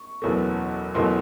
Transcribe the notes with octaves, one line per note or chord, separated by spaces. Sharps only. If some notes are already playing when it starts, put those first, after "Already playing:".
Already playing: C#6
F#1 E2 B2 F#3 A3
F#1 E2 B2 F#3 A3 C6